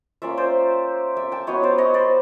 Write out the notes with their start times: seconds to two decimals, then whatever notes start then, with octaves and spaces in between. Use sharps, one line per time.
0.22 A#3 C#4 F4 D5 E5
0.37 C5 D5
1.17 D5 E5
1.32 G5 A5
1.47 F#3 B3 E4 C#5 D#5
1.63 C5 D5
1.78 C#5 D#5
1.94 C5 D5